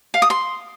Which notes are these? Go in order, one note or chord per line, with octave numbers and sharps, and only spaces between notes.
F5
D#6
C6